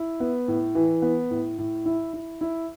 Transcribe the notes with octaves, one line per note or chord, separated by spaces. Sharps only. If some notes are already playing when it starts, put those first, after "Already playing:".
Already playing: E4
B3
A2
E3
B3
A2
A2
E4
E4
E4